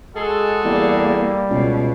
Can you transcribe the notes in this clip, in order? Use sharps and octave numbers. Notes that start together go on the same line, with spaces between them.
G#3 F#4 G#4 A4
E2 G3 A#3
C#2 B2